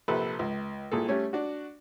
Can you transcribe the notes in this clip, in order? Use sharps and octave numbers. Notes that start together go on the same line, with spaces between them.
A#1 C3 A4 B4 E6
C#2
C2 A#2 G#4 A4
G3 A3 C#4 C#5
D4 F#4